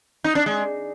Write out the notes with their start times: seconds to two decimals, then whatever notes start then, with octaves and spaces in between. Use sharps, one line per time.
0.24 D#4
0.35 D4
0.46 G#3